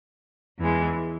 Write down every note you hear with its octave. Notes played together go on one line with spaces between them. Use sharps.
E2 E3 G#3